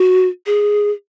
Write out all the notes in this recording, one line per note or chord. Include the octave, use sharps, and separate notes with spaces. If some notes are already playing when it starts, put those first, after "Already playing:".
Already playing: F#4
G#4